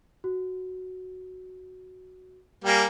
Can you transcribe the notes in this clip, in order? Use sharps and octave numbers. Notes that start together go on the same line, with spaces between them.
F#4
G3 A#3 G5 G#5